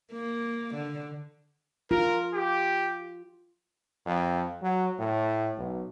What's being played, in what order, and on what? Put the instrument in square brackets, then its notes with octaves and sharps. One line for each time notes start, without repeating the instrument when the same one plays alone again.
[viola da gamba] A#3
D3
[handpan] F4 [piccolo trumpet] A#4
[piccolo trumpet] G4
[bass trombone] F2
F#3
A2
B1